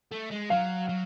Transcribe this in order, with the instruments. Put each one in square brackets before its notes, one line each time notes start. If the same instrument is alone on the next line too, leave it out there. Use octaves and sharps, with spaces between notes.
[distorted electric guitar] A3
G#3
[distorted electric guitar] F#3 [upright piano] F5
[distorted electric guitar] F#3